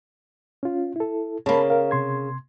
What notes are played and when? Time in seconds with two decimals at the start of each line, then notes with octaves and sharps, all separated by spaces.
0.63 C#4 F4
0.96 E4 A4
1.46 C#3 A#3 A5 B5
1.70 A#4 F5
1.91 C3 C6 G#6